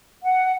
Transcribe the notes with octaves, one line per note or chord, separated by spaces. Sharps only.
F#5